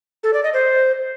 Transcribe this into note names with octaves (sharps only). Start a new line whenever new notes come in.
A4
D5
D#5
C5